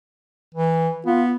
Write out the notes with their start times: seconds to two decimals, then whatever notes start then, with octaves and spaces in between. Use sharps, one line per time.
0.55 E3
1.06 B3 F4